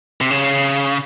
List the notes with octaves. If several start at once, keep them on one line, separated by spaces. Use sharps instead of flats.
C3
C#3